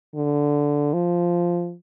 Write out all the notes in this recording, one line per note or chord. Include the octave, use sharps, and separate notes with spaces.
D3
F3